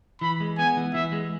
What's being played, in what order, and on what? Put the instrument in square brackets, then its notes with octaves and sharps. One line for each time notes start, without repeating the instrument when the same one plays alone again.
[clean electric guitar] E3 [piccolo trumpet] B5
[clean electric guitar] G#3
[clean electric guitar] B3 [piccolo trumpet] G#5
[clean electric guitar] E3
[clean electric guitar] E3 [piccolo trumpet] E5
[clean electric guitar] G#3